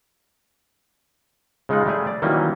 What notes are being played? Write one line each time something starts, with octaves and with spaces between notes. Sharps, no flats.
C#3 G#3 D#4 F4 F#5
G3 A3 G4 G#4
D5
D#3 E3 F#3 G3 A#3 C#4